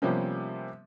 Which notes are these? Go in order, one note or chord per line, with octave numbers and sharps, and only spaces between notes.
C3 F3 G3 A#3 B3 C#4